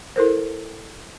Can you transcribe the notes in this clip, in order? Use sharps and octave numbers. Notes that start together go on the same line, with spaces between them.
E4 A4 A#4 C5